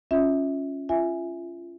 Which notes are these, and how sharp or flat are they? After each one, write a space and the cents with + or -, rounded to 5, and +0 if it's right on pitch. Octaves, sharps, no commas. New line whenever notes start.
C#4 +0 F4 +0 E5 -25
F4 -25 E5 +0 G#5 +0